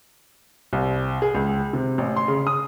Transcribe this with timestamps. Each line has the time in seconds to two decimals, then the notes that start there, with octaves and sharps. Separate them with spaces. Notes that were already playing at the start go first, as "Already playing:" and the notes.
0.73 C2
1.22 G#4
1.35 C#2
1.73 C3
1.98 A1
2.16 C6
2.28 C#3
2.47 D#6